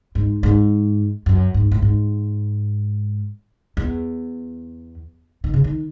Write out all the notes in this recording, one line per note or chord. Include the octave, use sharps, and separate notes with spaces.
G#2
G#2
F#2
G#2
A2
G#2
E2
D#3
C#3
D#3